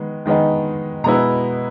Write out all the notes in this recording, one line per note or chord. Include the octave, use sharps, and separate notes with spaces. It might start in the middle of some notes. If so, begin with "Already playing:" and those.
Already playing: D#3 G#3 B3
D#3 G#3 B3 D#4
B2 G#3 B3 E4 A#5